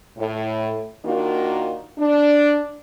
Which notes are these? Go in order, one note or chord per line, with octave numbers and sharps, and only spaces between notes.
A2
D#3 A#3 D4 F4 F#4
D4